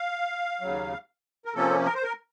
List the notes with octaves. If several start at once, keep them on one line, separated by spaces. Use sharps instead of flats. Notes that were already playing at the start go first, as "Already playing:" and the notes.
Already playing: F5
D#2 C#3 F#3
A#4
C3 F3 A#3 C#4 A4
A#4
C5
A#4